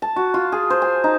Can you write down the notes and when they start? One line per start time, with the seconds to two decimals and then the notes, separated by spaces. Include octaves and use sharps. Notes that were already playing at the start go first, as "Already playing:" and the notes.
0.02 A5
0.16 F#4
0.34 F4
0.52 G#4
0.70 C5
0.82 G#5
1.04 D#4